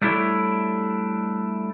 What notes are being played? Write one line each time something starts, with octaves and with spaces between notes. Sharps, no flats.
G3 A3 D4 E4 A4 C#5